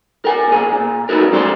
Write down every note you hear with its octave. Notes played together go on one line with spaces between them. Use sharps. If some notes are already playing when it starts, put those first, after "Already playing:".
A#4 G5 G#5
A#2 G#4
A#2
B3 D#4 E4 F#4 A#4
F#2 A2 G3 C5 D5 C6